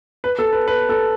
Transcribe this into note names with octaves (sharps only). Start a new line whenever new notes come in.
B4
A4
B4
B4
A4